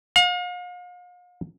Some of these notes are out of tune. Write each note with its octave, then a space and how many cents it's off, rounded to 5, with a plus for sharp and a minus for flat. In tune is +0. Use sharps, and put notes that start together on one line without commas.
F5 +40